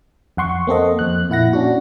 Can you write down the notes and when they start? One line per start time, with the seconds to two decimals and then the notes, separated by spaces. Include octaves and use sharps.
0.37 F2 F#5 C6 C#6
0.67 A#3 C4 A4 D#5
0.99 F2 F#6
1.30 A#2 E4 F#5 A#6
1.53 C#4 D4 F#4